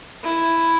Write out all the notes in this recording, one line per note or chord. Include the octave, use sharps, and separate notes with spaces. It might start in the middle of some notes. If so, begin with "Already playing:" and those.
E4